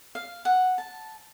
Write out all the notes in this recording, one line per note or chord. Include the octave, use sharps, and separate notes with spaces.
F5
F#5
A5